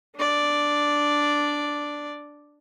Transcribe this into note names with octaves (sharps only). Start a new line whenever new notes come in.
D4 D5